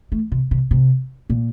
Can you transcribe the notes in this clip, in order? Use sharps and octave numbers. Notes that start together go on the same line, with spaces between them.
A3
C3
C3
C3
A#2